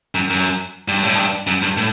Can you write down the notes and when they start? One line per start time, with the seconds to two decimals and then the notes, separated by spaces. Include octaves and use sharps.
0.15 F#2
0.30 F#2
0.88 G2
1.03 A2
1.16 G2
1.47 F#2
1.62 G2
1.77 A2